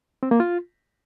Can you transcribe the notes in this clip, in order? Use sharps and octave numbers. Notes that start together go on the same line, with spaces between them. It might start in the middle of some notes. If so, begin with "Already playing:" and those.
C4
A#3
F4